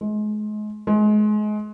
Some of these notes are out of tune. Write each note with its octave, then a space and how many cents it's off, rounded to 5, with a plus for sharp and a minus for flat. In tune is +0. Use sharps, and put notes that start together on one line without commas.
G#3 +35
G#3 +30